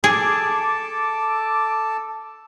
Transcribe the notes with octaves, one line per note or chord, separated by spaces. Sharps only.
G#4 A4 A5 D6